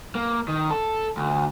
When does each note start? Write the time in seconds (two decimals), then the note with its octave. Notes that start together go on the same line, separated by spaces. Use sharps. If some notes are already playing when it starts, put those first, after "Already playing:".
0.15 A#3
0.48 D#3
0.71 A4
1.17 D2